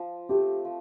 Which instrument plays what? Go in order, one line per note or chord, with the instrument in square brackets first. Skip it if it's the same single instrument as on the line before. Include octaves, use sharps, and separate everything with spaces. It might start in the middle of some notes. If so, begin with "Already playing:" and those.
Already playing: [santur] F3
[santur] A3 C4 [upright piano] G4
[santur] F3